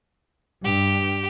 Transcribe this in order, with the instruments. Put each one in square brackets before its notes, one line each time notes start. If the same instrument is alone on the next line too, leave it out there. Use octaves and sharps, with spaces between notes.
[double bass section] G2 [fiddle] G4